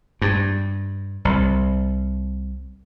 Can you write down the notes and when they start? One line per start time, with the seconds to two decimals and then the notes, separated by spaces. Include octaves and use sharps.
0.22 G2
1.25 C2